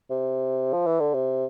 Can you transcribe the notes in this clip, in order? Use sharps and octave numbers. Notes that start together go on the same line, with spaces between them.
C3
F3
E3
D3
C3